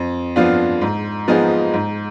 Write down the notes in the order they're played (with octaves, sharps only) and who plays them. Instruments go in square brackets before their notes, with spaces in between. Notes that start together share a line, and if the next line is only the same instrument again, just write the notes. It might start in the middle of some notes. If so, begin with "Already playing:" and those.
Already playing: [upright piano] F2
F3 B3 D4 F4
G#2
F3 B3 D#4 G#4
G#2